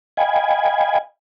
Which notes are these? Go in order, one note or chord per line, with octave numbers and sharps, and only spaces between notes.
D#5 F5 G5 G#5 B5 G#6